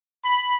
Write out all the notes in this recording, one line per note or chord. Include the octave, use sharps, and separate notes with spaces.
B5